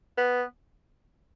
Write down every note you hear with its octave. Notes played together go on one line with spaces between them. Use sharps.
B3